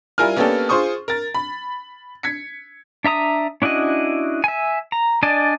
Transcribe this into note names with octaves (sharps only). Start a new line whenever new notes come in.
G3 E4 F4 A#4 G#5 F6
A#3 B3 C#4 D4 G4 A4
F4 G#4 C5 C6 C#6 D#6
A#4 A6
B5
G#6 B6 C#7
D4 E5 A#5 D#6
C#4 D4 E4 F#4 D#5
E5 G#5
A#5
D4 D5 D#5 G#5 A5